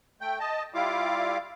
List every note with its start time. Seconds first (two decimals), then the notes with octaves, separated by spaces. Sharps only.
0.21 A3 G5
0.40 D#5 A5
0.74 G3 E4 F4 F5 D6